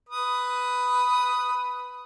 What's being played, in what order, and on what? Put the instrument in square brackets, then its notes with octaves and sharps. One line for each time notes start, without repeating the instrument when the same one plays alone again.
[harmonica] B4 D#6